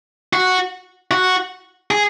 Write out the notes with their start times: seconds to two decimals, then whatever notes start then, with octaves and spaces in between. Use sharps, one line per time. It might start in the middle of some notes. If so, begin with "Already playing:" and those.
0.33 F#4
1.11 F#4
1.91 G#4